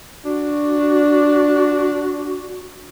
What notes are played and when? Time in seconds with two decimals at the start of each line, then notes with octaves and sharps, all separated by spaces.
0.25 D4 F#4